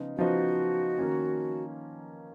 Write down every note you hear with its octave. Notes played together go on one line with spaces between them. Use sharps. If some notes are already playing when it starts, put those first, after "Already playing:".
Already playing: C#3 F3 B3 D#4
C#3 F3 B3 D#4 F#4
D#3 A#3 C#4